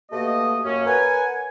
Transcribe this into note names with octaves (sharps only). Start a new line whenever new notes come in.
B2 A3 A#3 G4 D#5
F#2 A#3 C#4
A#4 B4 C#5 F#5 G#5